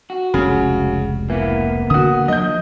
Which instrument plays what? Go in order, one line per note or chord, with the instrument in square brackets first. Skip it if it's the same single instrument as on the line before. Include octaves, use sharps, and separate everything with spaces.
[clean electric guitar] F#4
[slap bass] F1 C#2 G3 [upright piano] C#3
[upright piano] E3 [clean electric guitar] A#3 B3
[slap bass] A1 C#3 [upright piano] F#4 D#6
[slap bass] F3 F#3 D4 [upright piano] D#5 G6